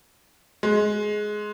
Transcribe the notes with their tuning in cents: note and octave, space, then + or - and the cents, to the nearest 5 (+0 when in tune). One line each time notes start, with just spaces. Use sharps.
G#3 +15